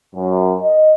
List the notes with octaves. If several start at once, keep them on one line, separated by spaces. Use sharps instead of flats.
F#2
D#5